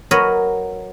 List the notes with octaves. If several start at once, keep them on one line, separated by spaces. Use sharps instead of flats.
F#3 A#4 B4 C#5 D#5